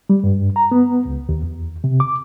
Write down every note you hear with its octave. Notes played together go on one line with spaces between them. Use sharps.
G3
G2
A#5
B3
C#2
D#2
E2
C3
D6